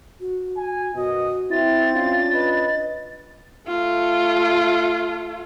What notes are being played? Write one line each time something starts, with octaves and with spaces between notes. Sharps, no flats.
F#4
G#5
F#2 B2 F#4 D#5
C4 E4 A6
C#4 D4 F4 F5
B4 D#5
A3 F4